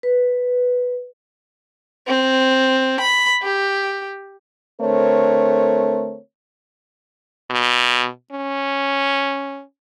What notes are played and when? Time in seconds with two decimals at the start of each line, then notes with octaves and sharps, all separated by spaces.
0.03 B4
2.07 C4
3.00 B5
3.43 G4
4.81 D3 A3 C4 A#4 C#5
7.51 B2
8.32 C#4